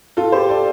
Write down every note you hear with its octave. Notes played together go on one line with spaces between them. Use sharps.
F4 A4
G4 C5
A4 D5